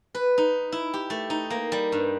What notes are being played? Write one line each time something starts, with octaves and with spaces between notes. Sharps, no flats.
B4
D#4
E4
G4
A3
D#4
A#3
G3
G2